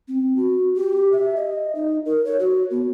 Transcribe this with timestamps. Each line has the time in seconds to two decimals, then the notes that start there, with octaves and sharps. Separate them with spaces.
0.08 C4
0.36 F#4
0.75 G4
1.12 E5
1.36 D#5
1.75 D#4
2.06 A#4
2.25 C#5
2.40 F#4
2.71 B3